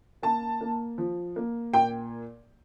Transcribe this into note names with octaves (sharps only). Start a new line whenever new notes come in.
A#3 A5
A#3
F3
A#3
A#2 G5